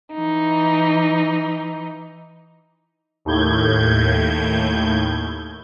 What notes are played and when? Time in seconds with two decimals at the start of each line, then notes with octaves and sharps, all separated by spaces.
0.13 E3 D#4
3.25 D#2 A2 G6 G#6